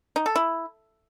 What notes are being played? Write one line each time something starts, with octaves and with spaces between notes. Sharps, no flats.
D#4
A4
E4